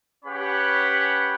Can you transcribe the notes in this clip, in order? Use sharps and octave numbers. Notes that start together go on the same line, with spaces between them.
C#4 G4 B4 C#5 F#5 B5